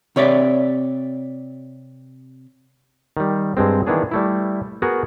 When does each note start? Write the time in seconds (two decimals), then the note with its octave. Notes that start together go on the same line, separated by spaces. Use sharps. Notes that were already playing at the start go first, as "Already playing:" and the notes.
0.16 C3 C#5 D5 E5
3.17 D#3 G3
3.57 G2 G#3 C4
3.87 D#3 E3 B3 D4 G#4
4.12 G3 A3 E4
4.82 B3 F#4 G#4 A#4